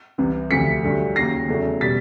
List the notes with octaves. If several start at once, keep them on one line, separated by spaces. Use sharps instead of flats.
C2 C3 E3
D2 C3 F3 A3 B6 C#7
G2 D3 F#3 A3
D#2 C#3 F#3 A#6 C7
E2 C#3 F#3 A3
B2 G3 A6 B6